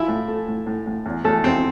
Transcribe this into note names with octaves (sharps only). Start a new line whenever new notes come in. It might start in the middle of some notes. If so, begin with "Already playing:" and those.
Already playing: F3 E4 E5
A2
A3
A2
A2
A2
E2
E2 A3 A4
E2 C4